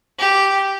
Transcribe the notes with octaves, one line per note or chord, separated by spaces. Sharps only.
G4